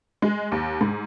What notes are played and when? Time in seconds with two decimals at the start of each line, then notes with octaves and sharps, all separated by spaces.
0.22 G#3
0.52 D#2
0.81 G#2